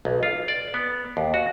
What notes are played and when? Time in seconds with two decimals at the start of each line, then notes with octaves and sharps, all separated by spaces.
0.05 B1
0.23 F4
0.48 D5
0.74 B3
1.17 D#2
1.34 F#4